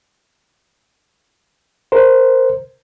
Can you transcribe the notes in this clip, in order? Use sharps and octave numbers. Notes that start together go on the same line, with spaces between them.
A#4 C5